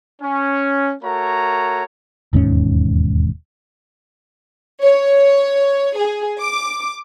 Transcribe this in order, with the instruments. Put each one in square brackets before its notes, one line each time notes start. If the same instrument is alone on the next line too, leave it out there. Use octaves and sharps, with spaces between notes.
[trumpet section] C#4
A3 F#4 A#4 C#5 A#5
[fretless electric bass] E1 D#2 G#2 C#4
[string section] C#5
G#4
D6